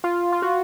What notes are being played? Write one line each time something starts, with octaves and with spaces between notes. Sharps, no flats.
F4
F4
F#4